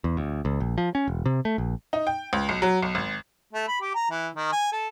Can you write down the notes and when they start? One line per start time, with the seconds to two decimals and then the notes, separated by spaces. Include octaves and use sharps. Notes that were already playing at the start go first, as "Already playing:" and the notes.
0.04 E2
0.17 D2
0.45 C#2
0.60 A#1
0.78 F3
0.95 C#4
1.08 E1
1.26 C3
1.45 A3
1.58 A#1
1.93 D#4
2.07 G5
2.33 C#2
2.49 B1
2.62 F#3
2.83 B1
2.95 G#1
3.53 A3
3.68 B5
3.82 G4
3.95 A#5
4.11 E3
4.36 D#3
4.52 G#5
4.73 A4